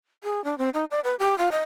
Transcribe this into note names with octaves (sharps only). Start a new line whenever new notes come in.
G#4
D4
C4
D#4
D5
B4
G4
F4
D#5